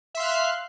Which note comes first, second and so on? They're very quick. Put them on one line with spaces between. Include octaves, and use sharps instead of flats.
E5 C6 F5 F#6 F6